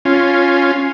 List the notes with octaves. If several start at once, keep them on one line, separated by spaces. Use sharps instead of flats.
C#4 F4